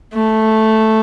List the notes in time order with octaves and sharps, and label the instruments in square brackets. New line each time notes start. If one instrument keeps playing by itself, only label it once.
[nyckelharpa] A3